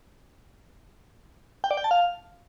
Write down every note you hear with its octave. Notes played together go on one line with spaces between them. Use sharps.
G5
D5
G5
A5
F5